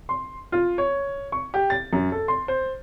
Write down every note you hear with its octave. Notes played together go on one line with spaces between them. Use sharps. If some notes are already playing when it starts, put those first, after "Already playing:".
C6
F4
C#5
C#6
G4
A6
F#2
A4
C6
C5